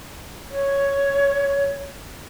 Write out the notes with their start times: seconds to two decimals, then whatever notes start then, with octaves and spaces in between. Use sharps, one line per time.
0.51 C#5